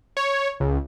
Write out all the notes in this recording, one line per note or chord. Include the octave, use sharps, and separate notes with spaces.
C#5
C#2